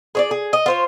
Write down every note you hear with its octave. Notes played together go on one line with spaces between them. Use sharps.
G#4 C#5 D5
G#4
D#5
F4 C5 C#5